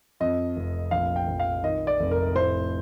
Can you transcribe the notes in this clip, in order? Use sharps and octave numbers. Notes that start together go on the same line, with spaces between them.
F2 D#5
F1
A#1 F5
G5
A#1
F5
D#3 D#5
D5
F1
A#4
A2 C5